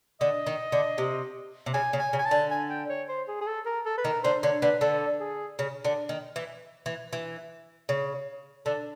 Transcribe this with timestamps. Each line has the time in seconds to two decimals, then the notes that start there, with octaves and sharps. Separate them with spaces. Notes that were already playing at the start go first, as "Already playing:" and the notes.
0.20 D3 D#5
0.47 D#3
0.72 D3
0.98 C3
1.66 C3
1.74 C#3 G#5
1.93 C#3
2.00 G#5
2.13 C#3
2.19 G#5
2.25 A5
2.31 D3
2.51 G#5
2.70 G5
2.89 C#5
3.09 C5
3.28 G#4
3.41 G#4
3.47 A4
3.66 A#4
3.86 A4
3.98 B4
4.05 D#3 A#4
4.24 D3 C5
4.43 D3 C#5
4.62 D3 B4
4.81 D3 A4
5.20 G#4
5.59 C#3
5.85 D3
6.09 D#3
6.36 E3
6.86 E3
7.13 E3
7.89 C#3
8.66 D3 A4